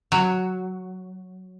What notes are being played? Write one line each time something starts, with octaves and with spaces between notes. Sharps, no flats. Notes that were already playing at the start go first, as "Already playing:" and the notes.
F#3